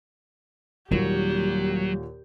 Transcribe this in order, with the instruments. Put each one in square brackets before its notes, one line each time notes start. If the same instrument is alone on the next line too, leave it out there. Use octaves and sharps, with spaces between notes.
[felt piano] D#2 A#2 F#4 [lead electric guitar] F#3 [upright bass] G3 [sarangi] G4